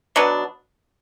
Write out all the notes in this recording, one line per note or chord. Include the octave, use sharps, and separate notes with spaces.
B2 F#3 B3 D4